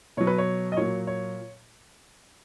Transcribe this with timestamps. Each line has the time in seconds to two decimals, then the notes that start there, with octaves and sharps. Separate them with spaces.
0.17 B2 F#3 C#5
0.27 B4
0.38 C#5
0.72 D#5
0.77 A#2 F#3 C#5
1.07 C#5